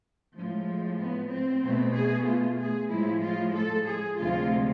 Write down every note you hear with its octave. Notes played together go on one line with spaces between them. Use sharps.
A2 F3 G#3
B3
C4
B2 A3
G#4
F4
G#4
A2 F3 G#3 E4
F4
A4
G#4
D2 C3 F3 G#3 F4